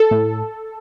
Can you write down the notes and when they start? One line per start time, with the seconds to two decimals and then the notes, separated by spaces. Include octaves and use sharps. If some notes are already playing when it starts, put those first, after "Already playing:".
Already playing: A4
0.11 A2